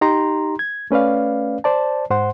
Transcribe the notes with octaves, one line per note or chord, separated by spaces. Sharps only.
D#4 G4 A#5 C6
G#6
A3 C#4 B4 D5 F5
C5 D5 A5
G#2 C5 F#5 C6